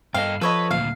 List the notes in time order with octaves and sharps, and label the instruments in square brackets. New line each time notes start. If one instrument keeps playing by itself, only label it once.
[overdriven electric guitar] G2 A4 [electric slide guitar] D#5 G5 [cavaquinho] F5
[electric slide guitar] F3 [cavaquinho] A4 C#5 D#5 [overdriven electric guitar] B4 B5
[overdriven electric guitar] D2 A#2 [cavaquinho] F5